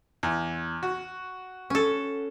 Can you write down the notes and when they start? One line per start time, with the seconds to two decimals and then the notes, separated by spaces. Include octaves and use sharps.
0.23 E2
0.83 F#4
1.70 C#4 A4